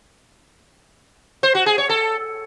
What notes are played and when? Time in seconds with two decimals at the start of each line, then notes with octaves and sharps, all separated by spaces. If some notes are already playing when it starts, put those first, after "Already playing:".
1.43 C5
1.55 F#4
1.66 G#4
1.78 C#5
1.89 A4